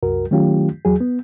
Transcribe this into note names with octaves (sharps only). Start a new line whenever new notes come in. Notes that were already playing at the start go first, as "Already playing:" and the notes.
C2 F#2 F#4 A#4
D#3 F#3 A3 C#4 F4 G4
E2 F#3 G#4
B3